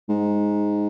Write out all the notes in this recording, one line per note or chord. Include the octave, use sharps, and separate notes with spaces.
G#2